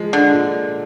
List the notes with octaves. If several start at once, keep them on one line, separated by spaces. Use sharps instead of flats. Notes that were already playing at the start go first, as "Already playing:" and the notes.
Already playing: F3 G#3
D3
A#2